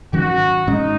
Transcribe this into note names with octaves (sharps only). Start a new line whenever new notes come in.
G#2 D#3 F#3 C#4 F#4
G#2 G#3 C#4 D#4